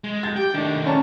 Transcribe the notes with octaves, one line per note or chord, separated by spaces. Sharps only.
G#3
G6 A6
G4 G5
A2 D#3 D4
C#4 D5 A5 A#5